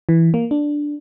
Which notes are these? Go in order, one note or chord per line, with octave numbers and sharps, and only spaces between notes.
E3
A#3
D4